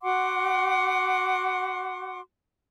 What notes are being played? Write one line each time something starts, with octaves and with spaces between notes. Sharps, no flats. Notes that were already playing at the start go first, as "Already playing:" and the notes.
F#4 F#5 C6 D6